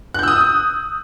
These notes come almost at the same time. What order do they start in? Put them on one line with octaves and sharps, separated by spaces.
F#6 G6 E6 D#6